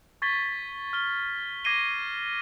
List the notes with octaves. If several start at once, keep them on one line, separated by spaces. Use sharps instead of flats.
C#6 G#6 A6 B6 G7
F6 G7
D6 G#6 A#6 C7 D#7 G7